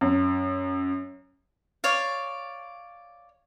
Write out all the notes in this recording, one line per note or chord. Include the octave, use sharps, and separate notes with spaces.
F#2
C#5 D5 F5